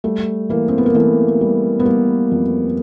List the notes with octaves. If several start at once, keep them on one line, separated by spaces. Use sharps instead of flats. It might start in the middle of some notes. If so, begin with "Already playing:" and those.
G3 A3
E3 A#3
C4
B3
A#3
E3 A3
G3
B3
G3 A#3
F2